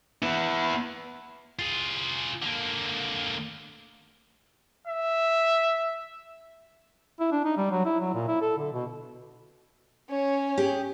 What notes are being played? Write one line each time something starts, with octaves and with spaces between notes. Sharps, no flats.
B3 E4
F4 G#4
D3 A#3
E5
E4
D4
D#4
G3
F#3
E4
F#3
A#2
E4
A4
D3
B2
C#4 C#5
G4 G#4